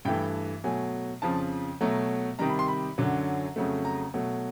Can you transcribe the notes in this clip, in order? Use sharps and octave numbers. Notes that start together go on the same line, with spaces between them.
G2 E3 A3 G5
B2 F#3 A3 G#5
F2 C#3 F3 A5
B2 F#3 A3 A#5
C3 D#3 G3 A#5
B5
C6
B5
F#2 D3 F#3
F2 C#3 F#3 A3
A#5
B2 F#3 A3